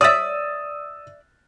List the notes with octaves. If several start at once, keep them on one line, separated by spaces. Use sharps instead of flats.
D5 E5 D#6 E6 A6